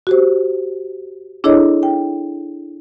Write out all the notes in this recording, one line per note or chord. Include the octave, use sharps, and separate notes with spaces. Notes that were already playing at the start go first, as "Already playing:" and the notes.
F#4 G4 C5
D4 E4 G#4 A4 C#5 D#5
G5